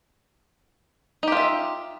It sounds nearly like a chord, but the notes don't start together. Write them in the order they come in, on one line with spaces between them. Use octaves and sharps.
D#4 G4 F4 E5